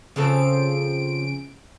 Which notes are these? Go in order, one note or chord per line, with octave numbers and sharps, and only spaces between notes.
C#3 F3 C4 A4 D7